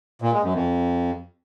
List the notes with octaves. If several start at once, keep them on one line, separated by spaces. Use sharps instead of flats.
A#2
G#3
F#2
F2